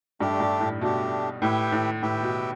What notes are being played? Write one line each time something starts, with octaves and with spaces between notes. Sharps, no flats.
G2 A3 D4 G4
G2
A2
B2 A3 D4 G4
A2 G4 B4 E5 G5
A2
A2 G4 B4 E5 G5
B2